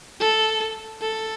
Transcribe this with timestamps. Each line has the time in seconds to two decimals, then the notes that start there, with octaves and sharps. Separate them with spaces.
0.20 A4
1.01 A4